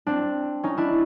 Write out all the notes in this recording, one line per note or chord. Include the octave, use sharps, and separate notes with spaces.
C4 D4
C#4 D#4
D4 E4